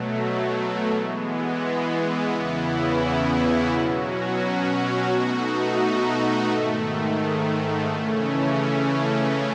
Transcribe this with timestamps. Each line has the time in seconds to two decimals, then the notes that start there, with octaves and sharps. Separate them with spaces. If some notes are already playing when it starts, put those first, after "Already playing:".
Already playing: B2 F#3 A3
0.91 E3 G#3 B3
2.30 E2 C#3 E3 B3 E4
3.70 B2 F#3 C#4 F#4
5.09 B2 A3 D#4 F#4
6.49 G#2 D#3 A3
7.88 C#3 E3 A3 C#4